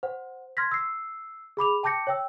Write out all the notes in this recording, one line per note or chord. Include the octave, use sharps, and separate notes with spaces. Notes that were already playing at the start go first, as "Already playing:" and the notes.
C5 F#5
C6 F6 G#6 A#6 B6
E6 C7
G#4 B5 D6 F7
G5 A5 D6 G6 A#6 C#7
C#5 G5 E6